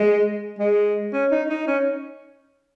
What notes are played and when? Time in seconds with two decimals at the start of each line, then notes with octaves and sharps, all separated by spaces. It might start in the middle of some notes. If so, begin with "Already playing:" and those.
Already playing: G#3
0.59 G#3
1.13 C#4
1.31 D#4
1.50 D#4
1.68 C#4